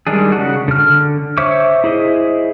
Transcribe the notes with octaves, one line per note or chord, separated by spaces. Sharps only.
D#3 G3 G#3 D4 G#4
C#3 F#4
D3 F6
C5 C#5 E5 C#6 D6
E4 G#4 C5 D#5